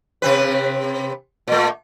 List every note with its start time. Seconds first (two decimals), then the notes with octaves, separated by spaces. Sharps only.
0.22 C3 C4 B4
1.48 A#2 A3